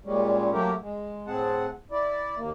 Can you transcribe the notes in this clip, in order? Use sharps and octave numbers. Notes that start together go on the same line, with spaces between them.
A#2 G3 G#3 C#4
F#3 A3 A#3 E4 G4 A#4
G#3
A2 C4 G#4 F#5 A5
E4 D5
D#2 A#3